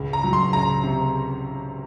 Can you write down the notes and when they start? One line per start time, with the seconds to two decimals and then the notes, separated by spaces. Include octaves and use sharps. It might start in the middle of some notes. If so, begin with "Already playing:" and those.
Already playing: C#2 C#3
0.13 A#5
0.24 F#3
0.33 C6
0.53 C#2 A#5
0.83 C3